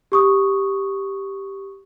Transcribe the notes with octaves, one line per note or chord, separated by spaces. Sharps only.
G4 C#6 D#6